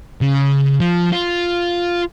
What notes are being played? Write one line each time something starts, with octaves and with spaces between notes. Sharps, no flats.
C#3
F3
F4